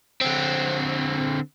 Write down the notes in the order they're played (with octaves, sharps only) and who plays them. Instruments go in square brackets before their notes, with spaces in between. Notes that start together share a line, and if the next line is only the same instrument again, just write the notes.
[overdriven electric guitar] D3 C4